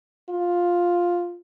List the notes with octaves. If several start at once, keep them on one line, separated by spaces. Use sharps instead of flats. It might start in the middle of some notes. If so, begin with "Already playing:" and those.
F4